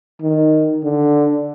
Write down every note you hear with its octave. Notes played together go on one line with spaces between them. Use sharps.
D#3
D3